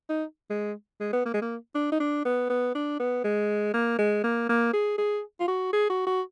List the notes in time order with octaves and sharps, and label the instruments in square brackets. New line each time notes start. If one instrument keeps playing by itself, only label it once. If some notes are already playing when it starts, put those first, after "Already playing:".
[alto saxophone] D#4
G#3
G#3
B3
A#3
G#3
A#3
D4
D#4
D4
B3
B3
D4
B3
G#3
A#3
G#3
A#3
A#3
G#4
G#4
F4
F#4
G#4
F#4
F#4